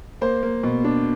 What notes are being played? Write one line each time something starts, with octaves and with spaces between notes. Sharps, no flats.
A#3 C5
A#3
B2
D4